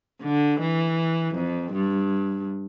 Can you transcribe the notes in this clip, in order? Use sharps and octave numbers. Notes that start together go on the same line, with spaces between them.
D3
E3
F2
G2